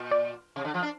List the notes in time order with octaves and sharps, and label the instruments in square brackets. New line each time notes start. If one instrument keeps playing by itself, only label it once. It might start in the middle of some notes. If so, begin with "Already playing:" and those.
Already playing: [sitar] A#2
[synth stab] D5
[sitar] C3
D3
F3
D4